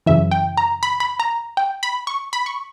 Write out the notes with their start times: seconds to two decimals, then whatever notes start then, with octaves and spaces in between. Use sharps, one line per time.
0.06 F#2 C#3 E3 E5
0.31 G5
0.57 A#5
0.83 B5
1.00 B5
1.20 A#5
1.57 G5
1.83 B5
2.07 C#6
2.33 B5
2.46 C#6